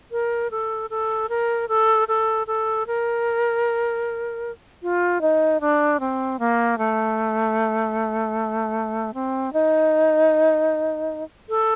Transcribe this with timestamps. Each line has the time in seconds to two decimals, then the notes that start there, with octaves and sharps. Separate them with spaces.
0.12 A#4
0.51 A4
0.90 A4
1.29 A#4
1.69 A4
2.08 A4
2.47 A4
2.87 A#4
4.82 F4
5.21 D#4
5.61 D4
6.00 C4
6.39 A#3
6.78 A3
9.14 C4
9.53 D#4
11.49 A4